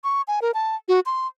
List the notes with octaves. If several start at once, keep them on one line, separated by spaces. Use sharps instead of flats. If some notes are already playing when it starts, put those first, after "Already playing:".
C#6
G#5
A#4
A5
F#4
C6